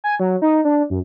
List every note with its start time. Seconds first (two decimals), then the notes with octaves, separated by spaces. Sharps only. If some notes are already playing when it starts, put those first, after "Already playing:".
0.04 G#5
0.20 F#3
0.42 D#4
0.65 D4
0.90 F#2